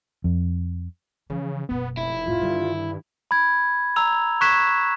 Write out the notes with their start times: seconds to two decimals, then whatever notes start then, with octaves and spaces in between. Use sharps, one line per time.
0.24 F2
1.30 C#3 E3 F3
1.69 F#1 B2 B3
1.97 F1 E4
2.26 F2 A2 F4
2.41 G2 D3 D#3
3.31 B5 G#6
3.96 A#5 E6 F7
4.41 C#6 F#6 G#6 B6 E7